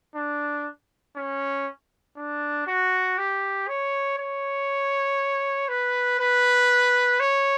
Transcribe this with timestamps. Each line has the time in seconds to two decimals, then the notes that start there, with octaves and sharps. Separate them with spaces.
0.15 D4
1.16 C#4
2.17 D4
2.67 F#4
3.18 G4
3.68 C#5
4.18 C#5
5.68 B4
6.20 B4
7.20 C#5